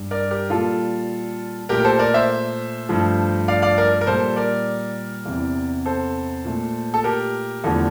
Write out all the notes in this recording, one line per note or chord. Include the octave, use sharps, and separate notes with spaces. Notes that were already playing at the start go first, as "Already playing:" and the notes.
Already playing: G2 G3
A#4 D5
G4 A#4
A#2 G3 F4 A4
A#2 A3 G4 A#4
A#4
A4 C5
A#4 D5
C5 E5
G2 F3 A3
D5 F5
D5 F5
A#4 D5
A#4
A#2 G3 A4 C5
A#4 D5
E2 C3 E3
A4 C5
A#2 A3
A4
G4 A#4
E2 D3 F3 A3